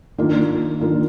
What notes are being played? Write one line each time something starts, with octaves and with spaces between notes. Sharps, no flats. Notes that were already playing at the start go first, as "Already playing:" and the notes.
D#3 A#3 D4 F4 A#4
D#3 A#3 D4 F4 A#4